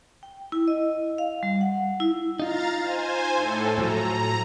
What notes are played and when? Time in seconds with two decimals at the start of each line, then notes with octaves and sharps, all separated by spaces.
0.23 G5
0.52 E4
0.68 D#5
1.18 F5
1.43 G3
1.61 F#5
2.00 E4
2.40 D#4 F4 F5 A#5 A6
2.80 C5 G#5
3.34 A2 A4
3.78 A2 F3 F#3 A#5